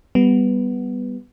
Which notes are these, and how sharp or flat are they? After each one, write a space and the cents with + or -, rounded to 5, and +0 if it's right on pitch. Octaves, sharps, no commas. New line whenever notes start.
G3 +0 B3 +0